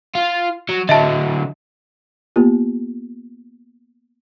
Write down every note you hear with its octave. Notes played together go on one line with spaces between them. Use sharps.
F4
F#3
D3 F#3 D#5 E5 A5
A#3 B3 F4 G4